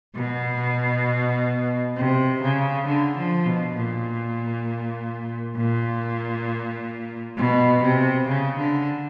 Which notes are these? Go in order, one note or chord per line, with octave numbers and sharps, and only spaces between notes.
B2
C3
C#3
D3
F3
B2
A#2
A#2
B2
C3
C#3
D3